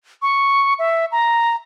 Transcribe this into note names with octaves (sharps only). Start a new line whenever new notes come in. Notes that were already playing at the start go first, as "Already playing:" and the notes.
C#6
E5
A#5